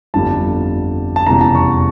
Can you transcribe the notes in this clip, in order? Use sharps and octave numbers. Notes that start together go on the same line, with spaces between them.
G1 F2 D3 G3 A5
A5
F1 E2 C#3 G3 A#5
A5
C#6